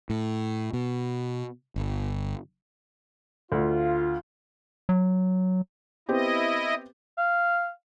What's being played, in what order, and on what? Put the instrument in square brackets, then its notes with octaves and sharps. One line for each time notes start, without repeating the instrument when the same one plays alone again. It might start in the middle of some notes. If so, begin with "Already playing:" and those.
[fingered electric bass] A2
B2
G1
[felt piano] D2 [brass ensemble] F4
[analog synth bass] F#3
[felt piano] B3 C4 G4 [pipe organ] E4 D#5
[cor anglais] F5